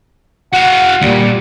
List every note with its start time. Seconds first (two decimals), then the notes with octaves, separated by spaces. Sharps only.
0.53 F#4 F5 F#5
1.02 D2 A#2 G3